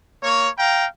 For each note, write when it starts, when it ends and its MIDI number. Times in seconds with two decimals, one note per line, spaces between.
0.22 0.48 58
0.22 0.48 73
0.57 0.86 77
0.57 0.86 79
0.57 0.86 82